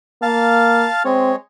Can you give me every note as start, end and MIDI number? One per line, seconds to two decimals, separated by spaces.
0.22 0.86 58
0.22 1.03 77
0.22 1.03 81
0.22 1.03 89
1.05 1.36 56
1.05 1.32 60
1.05 1.36 73